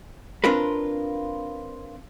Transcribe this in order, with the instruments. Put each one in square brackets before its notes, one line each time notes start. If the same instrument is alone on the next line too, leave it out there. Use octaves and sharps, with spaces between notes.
[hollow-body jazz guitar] C4 D4 F4 A#4 B4